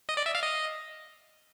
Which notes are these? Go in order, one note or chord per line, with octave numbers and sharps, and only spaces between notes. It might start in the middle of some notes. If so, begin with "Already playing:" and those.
D#5
D5
E5
F5
D#5